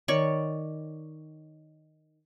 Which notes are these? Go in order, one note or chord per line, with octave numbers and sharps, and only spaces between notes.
D#3 C#5 D5 C#6